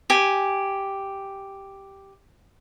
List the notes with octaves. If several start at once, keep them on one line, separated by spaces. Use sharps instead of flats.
G4 G#5